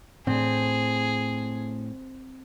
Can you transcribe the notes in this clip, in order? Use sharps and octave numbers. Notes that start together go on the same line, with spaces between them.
A2 C4 G#4